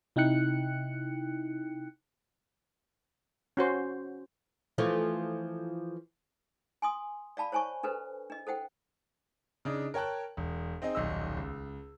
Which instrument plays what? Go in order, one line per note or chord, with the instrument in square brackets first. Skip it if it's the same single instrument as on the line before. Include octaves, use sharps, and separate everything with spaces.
[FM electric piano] C3 D#4 E4 G5 F#6 C#7
[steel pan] C#4 F#4 C5
[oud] E3 F3 A3
[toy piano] G#5 C6 D#6
D5 F5 A5 B5
C5 C#5 G#5 A5 C#6
D4 A4 B4 C5
D4 D#5
A4 C5 F#5 G5
[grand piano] C#3 D4 D#4
A#4 C#5 G5 A5 F#6
E1
C4 D#4 G#4 D#5
D#1 B1 D#5 E6
C#2